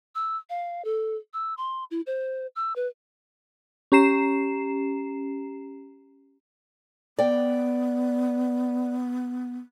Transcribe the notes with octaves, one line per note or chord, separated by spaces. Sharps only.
E6
F5
A4
E6
C6
E4
C5
E6
B4
C#4 G4 A#5 C7 E7
B3 D5 G5